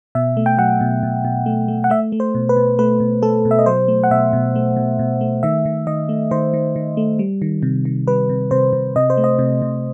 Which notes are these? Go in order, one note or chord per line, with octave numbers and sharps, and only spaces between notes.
B2 E5
A3
G5
F#3 F#5
B2
B2
B2
A3
A3
F#5
A3 E5
A3
C5
B2
B4
B2
A3 B4
B2
A3 A4
B2
E5
D#5
F#3 C5
A3
F#5
B2 E5
B2
A3
B2
B2
A3
D#3 E5
D#3
D#3 D#5
A3
D#3 C5
D#3
D#3
A3
G3
D#3
C3
D#3
G3 B4
C3
C3 C5
C3
C3 D#5
C5
A3
D#5
C3
C3